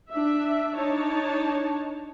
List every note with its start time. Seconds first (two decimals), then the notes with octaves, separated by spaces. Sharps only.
0.11 D4 E5
0.75 D4 D#4 C#5 A5